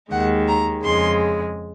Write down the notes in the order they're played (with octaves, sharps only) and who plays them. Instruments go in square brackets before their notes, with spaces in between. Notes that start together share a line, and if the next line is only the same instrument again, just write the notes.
[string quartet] D#2 D#3 G#3 F#5
A#5
F2 C#3 G#3 C6